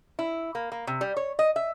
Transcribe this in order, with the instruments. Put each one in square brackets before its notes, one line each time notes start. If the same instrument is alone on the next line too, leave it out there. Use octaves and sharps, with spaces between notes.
[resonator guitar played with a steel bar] E4
A#3
A#3
C3
G3
C#5
D#5
E5